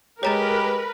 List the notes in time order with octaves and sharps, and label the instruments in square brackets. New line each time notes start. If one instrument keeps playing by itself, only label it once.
[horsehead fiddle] G#3 [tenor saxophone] G4 [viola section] A#4 B4 [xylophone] C#5 A#5 A6